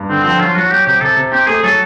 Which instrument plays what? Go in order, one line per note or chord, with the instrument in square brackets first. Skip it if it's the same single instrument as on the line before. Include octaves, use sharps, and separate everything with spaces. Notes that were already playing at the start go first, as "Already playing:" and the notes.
Already playing: [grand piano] G2
[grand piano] D3 [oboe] C4
[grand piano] F3 [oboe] C4
[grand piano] F#3 [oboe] F4
[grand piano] F#3 [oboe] F#4
[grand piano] F#3 [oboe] G4
[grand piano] C3 [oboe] G4
[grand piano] C3 [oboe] A4
[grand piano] C3
[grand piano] C4 [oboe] G4
[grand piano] A3 [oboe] G#4
[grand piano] F#3 [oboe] A4